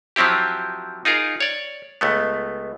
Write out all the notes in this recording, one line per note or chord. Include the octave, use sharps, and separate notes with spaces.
F3 F#3 C4 E4 G4
D#4 F4 G#4 A#4
C#5 D5
C#2 A3 B3